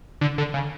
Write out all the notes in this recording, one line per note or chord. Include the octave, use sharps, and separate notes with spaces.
D3
D3
C#3